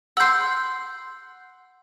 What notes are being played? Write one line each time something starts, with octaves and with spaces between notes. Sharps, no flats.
F#5 C6 E6 G6